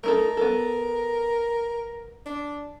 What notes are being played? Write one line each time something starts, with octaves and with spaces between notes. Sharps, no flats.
A3 D#4 A4 A#4
B3 A4
D4